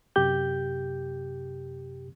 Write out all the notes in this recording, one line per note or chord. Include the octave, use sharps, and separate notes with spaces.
F#2 C3 G4 G6